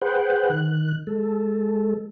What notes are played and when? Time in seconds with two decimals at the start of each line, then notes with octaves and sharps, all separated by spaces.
0.02 G#4 B4 C5 F#5 G5
0.50 D#3 F#6
1.07 G#3 A4